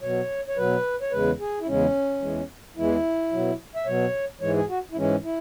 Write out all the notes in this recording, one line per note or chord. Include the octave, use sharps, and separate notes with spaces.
B2 F#3 C#5
C#5
B2 F#3 B4
C#5
E2 C#3 G#3 B4
G#4
E4
E2 C#3 G#3 C#4
E2 E3 G#3
E2 E3 G#3 E4
B2 F#3
E5
B2 F#3 C#5
G#2 E3 G#3 C#5
G#4
F#4
E4
G#2 E3 G#3 C#4
E4